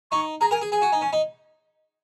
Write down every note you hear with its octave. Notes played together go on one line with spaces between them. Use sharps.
D#4 C#6
G#4 A#5
A#4 G#5
G#4
G#4 G#5
F#4
D#4
C#4
D#4